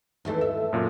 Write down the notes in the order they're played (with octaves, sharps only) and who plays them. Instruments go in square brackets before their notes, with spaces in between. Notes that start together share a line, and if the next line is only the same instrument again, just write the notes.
[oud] D#2 E3 A3
E5
[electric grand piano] F#2 A#2